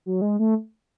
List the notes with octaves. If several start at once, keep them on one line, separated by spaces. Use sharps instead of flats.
F#3
G#3
A3